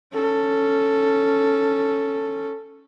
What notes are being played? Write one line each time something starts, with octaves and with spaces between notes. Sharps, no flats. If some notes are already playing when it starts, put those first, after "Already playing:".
C#4 A4